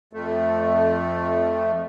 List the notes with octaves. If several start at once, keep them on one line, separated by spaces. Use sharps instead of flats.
F2 A3